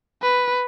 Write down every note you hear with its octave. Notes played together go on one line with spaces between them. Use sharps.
B4